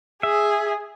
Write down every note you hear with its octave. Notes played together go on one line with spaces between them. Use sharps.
G#4 E5